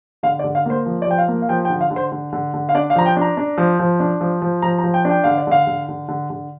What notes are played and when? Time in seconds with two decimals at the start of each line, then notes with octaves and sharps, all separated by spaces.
0.23 D3 F5
0.39 D5
0.44 D3
0.55 F5
0.66 A#3 C5
0.86 F3
1.02 D5
1.07 F3 G5
1.18 F5
1.28 A#3
1.42 F5
1.49 F3 G5
1.65 G5
1.70 D3
1.81 F5
1.91 D3
1.96 C5
2.12 D3
2.33 D3
2.54 D3
2.69 F5
2.74 D4 D5
2.90 F5
2.95 F3 A#5
3.06 G5
3.16 D4 A#5
3.37 D4
3.58 F3
3.79 F3
4.00 D4
4.21 F3
4.42 F3
4.62 F3 A#5
4.79 A#5
4.84 F3
4.94 G5
5.05 D4
5.10 G5
5.24 D3 F5
5.38 D5
5.47 D3 F5
5.67 D3
5.89 D3
6.08 D3
6.30 D3